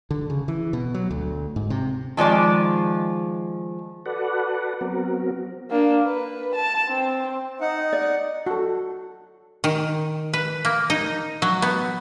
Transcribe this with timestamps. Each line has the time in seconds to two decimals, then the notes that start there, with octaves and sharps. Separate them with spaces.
0.11 D3
0.30 C#3
0.48 E3
0.73 B2
0.94 F#3
1.11 D2
1.56 G#2
1.70 C3
2.17 D#3 F3 G#3 D5
4.06 F#4 A4 B4 D5 F#5
4.81 F#3 B3 C4 F#4 A#4
5.70 A#3 D4
6.06 B4
6.55 A5
6.89 C4
7.61 D#4 D#5 F#5
7.93 D5
8.46 F#4 A4
9.64 D#3
10.33 B4
10.65 A#3
10.90 D#4
11.42 F#3
11.62 B3